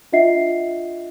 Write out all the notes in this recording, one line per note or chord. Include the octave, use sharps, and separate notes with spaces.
D4 F4 D#5 E5 F#5 C7